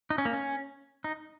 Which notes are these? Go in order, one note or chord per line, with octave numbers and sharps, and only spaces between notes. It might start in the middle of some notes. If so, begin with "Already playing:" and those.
D#4
C#4
A#3
C#4
D#4